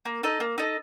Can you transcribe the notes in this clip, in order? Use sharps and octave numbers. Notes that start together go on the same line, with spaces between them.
A#3
D#4 A4 D#5
A#3
D#4 A4 D#5